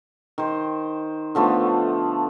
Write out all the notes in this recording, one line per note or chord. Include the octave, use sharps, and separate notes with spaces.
D#3 C5
D3 F3 A3 B3